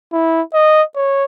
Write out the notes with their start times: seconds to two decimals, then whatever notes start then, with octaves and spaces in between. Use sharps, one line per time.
0.13 E4
0.53 D#5
0.96 C#5